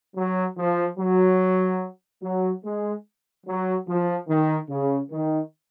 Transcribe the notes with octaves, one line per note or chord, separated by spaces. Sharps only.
F#3
F3
F#3
F#3
G#3
F#3
F3
D#3
C#3
D#3